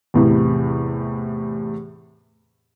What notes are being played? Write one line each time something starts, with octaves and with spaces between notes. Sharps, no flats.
E2 A2 C3